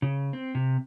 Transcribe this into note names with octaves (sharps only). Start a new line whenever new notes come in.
C#3
C4
C3